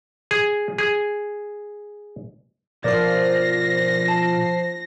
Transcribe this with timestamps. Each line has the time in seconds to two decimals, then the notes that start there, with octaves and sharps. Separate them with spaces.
0.31 G#4
0.78 G#4
2.84 B2 F3 F4 A#4 D5 A#6 C7
4.08 A5